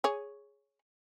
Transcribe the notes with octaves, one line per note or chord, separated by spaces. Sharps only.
G#4 C#5